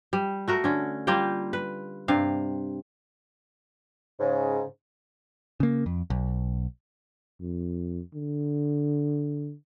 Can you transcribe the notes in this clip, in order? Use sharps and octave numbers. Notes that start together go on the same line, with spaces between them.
G3
A3 F#4 A#4
D3 C#4
G3 A#3 F4 G5
B4
G2 C3 F5
G#2 C#3
C#3 A#3
F2
B1
F2
D3